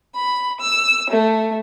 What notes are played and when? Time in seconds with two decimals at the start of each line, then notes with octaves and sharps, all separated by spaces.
0.15 B5
0.60 E6
1.09 A3